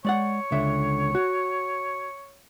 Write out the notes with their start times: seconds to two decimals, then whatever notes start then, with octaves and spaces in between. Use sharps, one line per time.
0.05 G#3 C#5 D5 F#5
0.52 C#2 D3 E5
1.15 F#4